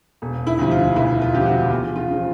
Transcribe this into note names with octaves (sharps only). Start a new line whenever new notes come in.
E1
E4
D2 C3 F3
F4
E1 E4
F4
D2 C3 F3 G4
F#4
E2 F4
F4
C#3 F3